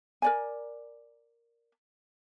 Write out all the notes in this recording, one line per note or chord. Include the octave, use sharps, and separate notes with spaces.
A#4 D5 G#5